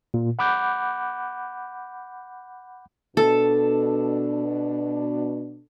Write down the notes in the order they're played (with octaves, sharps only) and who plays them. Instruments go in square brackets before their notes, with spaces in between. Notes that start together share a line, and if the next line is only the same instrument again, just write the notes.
[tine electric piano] A#2
F#5 B5 D6 F#6 G6
[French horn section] B2 D4 [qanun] A4